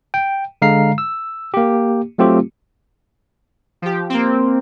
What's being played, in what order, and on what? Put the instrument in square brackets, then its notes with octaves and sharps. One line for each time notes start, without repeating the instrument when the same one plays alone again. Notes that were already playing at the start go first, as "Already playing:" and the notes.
[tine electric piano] G5
D3 G#3 F5 A#5 C7
E6
A#3 G4
F#3 A3 C4 F4 G4
[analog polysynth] F3 G4
A#3 C4